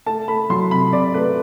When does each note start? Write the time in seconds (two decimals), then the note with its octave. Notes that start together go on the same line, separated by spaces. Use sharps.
0.06 A3 A5
0.28 A3 B5
0.50 F#3 C6
0.71 C3 B5
0.93 C3 D5
1.14 A3 B4